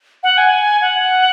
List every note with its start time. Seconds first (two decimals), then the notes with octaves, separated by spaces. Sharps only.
0.23 F#5
0.38 G#5
0.82 F#5